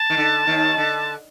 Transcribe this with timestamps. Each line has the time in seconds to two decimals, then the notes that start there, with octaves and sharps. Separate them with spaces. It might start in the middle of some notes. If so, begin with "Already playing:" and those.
Already playing: A5
0.10 D#3
0.17 D3
0.47 D#2 D#3
0.77 D3